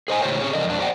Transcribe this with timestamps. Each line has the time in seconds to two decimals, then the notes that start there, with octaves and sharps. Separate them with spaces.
0.08 G#4 C5 D#5 G#5
0.21 A2 C#3 G4 C5 C#5 G5
0.40 C#4 G4 G#4 C#5
0.53 C#3 F3 A4 A#4 D5 D#5
0.67 F2 D4
0.79 G4 C5 D5 D#5 F#5 G5